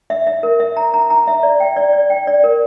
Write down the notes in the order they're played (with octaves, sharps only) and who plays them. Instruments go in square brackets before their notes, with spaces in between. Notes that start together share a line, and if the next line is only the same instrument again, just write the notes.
[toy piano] E5
E5
A#4
E5
A#5
A#5
A#5
E5
D5
G5
D5
D5
G5
D5
A#4